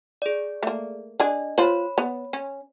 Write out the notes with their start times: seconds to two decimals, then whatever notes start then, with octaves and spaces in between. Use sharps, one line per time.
0.22 G#4 D5
0.63 A3 A#3
1.20 D4 G#4 D#5
1.58 F4 C5 C#5 B5
1.98 B3
2.33 C#4